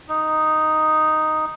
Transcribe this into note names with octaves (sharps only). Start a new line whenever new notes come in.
D#4